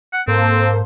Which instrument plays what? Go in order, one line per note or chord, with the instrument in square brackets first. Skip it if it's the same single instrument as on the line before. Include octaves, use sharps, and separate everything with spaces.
[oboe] F#5
[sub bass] G#2 [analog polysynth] A#3 A4 C5 [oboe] C4